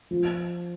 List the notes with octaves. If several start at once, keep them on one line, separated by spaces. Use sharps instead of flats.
F3